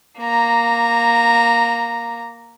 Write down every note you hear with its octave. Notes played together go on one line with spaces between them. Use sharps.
A#3 A#5